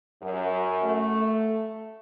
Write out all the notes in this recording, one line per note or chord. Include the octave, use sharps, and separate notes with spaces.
F#2
A3